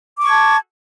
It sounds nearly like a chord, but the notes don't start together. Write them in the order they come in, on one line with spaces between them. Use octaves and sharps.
D6 C#6 G#6 A5